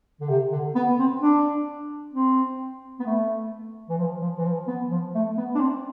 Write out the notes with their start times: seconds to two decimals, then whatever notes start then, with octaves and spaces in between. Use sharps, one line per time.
0.20 D3
0.29 C3
0.52 D3
0.75 B3
0.99 C4
1.21 D4
2.13 C4
3.00 B3
3.06 A3
3.89 E3
3.98 F3
4.21 F3
4.38 E3
4.45 F3
4.67 B3
4.91 F3
5.15 A3
5.37 B3
5.55 D4
5.60 C4